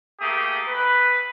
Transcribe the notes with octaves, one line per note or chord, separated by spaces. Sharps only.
A3 A#3 G4 G#4 D#6
B4